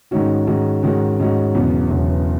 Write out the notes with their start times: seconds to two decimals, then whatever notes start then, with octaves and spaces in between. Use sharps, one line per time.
0.11 G#2 D#3 G#3 C#4 F#4
0.47 G#2 D#3 G#3 C#4 F#4
0.83 G#2 D#3 G#3 C#4 F#4
1.19 G#2 D#3 G#3 C#4 F#4
1.55 E1 E2 C#3 F#3 B3
1.91 E1 E2 C#3 F#3 B3